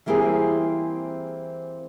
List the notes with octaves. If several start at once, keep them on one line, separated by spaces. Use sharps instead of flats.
E3 G3 A#3 C4 E4 G#4